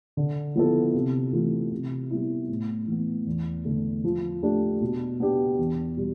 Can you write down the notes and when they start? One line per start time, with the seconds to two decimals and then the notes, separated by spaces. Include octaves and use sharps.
0.17 D3
0.56 F3 B3 E4 A4
0.94 C3
1.33 E3 A3 C4 F4
1.72 C3
2.10 G3 B3 E4
2.49 A2
2.87 E3 B3
3.27 E2
3.65 D3 A3
4.04 F3
4.42 A3 D4 G4
4.81 B2
5.20 B3 D4 G4
5.59 E2
5.97 B2 G3